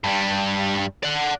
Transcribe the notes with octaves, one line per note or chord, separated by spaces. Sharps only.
G2 G3
D5 F#5